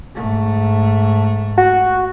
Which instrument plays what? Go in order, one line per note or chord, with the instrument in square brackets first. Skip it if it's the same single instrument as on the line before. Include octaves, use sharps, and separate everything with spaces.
[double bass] G#2 A3
[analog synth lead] F#4